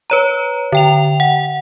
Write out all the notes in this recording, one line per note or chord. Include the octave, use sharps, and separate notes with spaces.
B4 C#5 A#5
D3 G5 F7
F#5